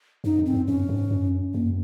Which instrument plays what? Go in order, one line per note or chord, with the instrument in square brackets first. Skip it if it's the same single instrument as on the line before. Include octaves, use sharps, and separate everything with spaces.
[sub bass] F#2 [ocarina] D#4
[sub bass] F2
[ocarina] C4
[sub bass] F#2
[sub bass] F#2 [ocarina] C#4
[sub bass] G#2
F#2
[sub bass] F#2 [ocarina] A#3